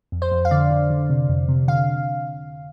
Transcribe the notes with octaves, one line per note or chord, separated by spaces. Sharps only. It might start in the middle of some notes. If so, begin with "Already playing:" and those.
F2
C5
F2
F5
D3 D5
D3
D3
C3
F2
C3
D3 F5